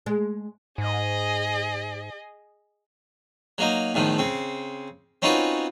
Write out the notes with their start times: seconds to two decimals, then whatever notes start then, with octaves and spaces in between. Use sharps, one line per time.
0.06 G#3
0.78 G#2 G#4 D#5
3.58 F#3 A#3 D#4
3.94 E2 A2 D#3 F3
4.18 C#3 C4
5.22 C4 C#4 D#4 F4 F#4 B4